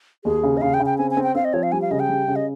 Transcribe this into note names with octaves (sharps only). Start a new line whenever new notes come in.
D#2 G#4
C#3
D#5
C#3 F5
G5
C#3
G5
C4 G#5
G#5
C4
G5
C4 F5
D#5
F3 C#5
F5
G3 G#5
F5
C#3 D#5
G5
G3
C#3
D#5